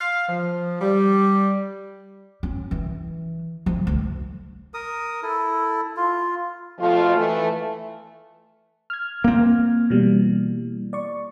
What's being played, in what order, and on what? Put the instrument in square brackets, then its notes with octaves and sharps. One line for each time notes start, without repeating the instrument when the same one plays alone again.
[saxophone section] F5
F3
G3
[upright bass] C#4
E3
F3
D2
[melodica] A#4 D#6
E4 A4
F4
[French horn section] F2 B2 F3 A3 F4
E3 A3
[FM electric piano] F6 G#6
[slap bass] A#3 C4
[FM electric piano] B2 E3 G3
D5 C#6